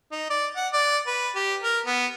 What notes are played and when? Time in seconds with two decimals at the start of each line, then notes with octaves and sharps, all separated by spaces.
0.12 D#4
0.30 D5
0.56 F#5
0.73 D5
1.07 B4
1.35 G4
1.62 A#4
1.86 B3